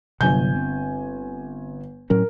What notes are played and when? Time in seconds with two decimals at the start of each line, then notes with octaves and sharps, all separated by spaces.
0.21 G1 C3 F#3 G#5 G6
0.56 C4
2.10 A2 F#3 C#4 A#4